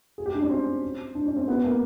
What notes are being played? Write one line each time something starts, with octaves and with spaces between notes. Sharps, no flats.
G#4
G4
D4
C#4
C4
D4
C#4
C4
B3
A#3